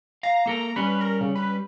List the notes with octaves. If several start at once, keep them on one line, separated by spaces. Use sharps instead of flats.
F5 A#5
A#3 A4 A#4
G3 C#4 B4
A#4
C#3
B4